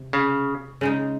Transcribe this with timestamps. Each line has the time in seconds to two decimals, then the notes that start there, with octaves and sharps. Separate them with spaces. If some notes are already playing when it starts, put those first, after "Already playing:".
Already playing: C3
0.13 C#3
0.81 C#3 G#3 D#4